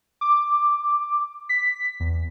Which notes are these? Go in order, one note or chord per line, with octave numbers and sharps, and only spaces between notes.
D6
B6
E2